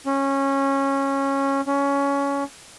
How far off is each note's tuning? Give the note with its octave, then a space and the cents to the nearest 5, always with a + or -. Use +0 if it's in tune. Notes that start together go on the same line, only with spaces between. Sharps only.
C#4 -15
C#4 +15